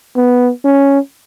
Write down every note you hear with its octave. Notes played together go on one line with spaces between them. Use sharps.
B3
C#4